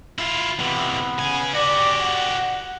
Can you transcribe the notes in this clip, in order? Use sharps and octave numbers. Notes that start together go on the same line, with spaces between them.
E4 F4
C3 E3 B3
C#3 G#5
F#4 G4 D5
F#5